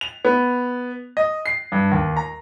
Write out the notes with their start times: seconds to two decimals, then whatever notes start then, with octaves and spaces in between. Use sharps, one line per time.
0.01 F7
0.25 B3
1.17 D#5
1.46 C7
1.72 G2
1.92 D#2
2.17 A#5